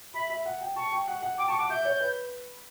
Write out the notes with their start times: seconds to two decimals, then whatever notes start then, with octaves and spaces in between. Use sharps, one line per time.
0.14 E5 B5
0.30 E5
0.46 F#5
0.61 G5
0.76 A5 C#6
0.91 G5
1.08 F#5
1.22 F#5
1.38 G5 D6
1.48 A5 C#6
1.58 F#5 D6
1.69 E5 G6
1.85 C#5
2.00 B4